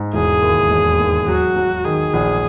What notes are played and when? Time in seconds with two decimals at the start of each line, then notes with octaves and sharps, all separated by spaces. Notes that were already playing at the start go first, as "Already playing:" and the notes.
Already playing: G#2
0.14 E1 G#4
0.42 D#2
0.71 E1
0.99 D#2
1.28 F#3 F#4
1.56 F#3
1.85 D#3 G#4
2.13 A#1